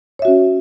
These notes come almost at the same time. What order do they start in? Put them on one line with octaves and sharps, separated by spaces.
C#5 E5 F#4 C#4